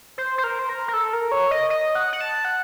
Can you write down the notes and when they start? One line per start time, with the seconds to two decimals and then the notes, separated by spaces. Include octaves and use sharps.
0.18 C5
0.38 C5
0.44 A#4
0.59 C5
0.69 A#4
0.88 A#4
0.94 A4
1.13 A#4
1.32 C#5
1.51 D#5
1.70 D#5
1.95 F#5
2.13 F#5
2.21 A5
2.45 F#5